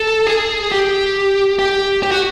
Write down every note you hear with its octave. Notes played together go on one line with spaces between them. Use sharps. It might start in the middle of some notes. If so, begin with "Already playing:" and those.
Already playing: A4
G#4
G4
G4
G4
F#4